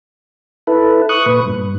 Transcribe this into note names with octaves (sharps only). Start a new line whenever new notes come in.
E4 A4 B4
C#6 D#6 F#6
A#2 B4
G2